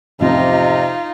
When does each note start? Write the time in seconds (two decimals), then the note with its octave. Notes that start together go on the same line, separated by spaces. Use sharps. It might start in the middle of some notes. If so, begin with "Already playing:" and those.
0.20 A1 F2 C3 D#4 F4 D#5